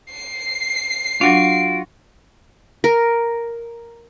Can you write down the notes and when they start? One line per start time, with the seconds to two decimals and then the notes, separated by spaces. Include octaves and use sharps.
0.11 C7
1.21 F#3 D4 F4 F#4 D7
2.84 A#4